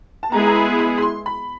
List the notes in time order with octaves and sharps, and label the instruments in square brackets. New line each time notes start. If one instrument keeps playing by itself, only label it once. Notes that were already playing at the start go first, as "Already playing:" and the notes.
[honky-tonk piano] A5
[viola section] G#3 B3 E4 G#4 [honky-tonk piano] A#5
[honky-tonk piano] A#5
B5
B5
B5
C6
B5